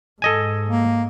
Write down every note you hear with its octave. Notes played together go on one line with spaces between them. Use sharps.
G#2 A4 D#5 G#5
A#3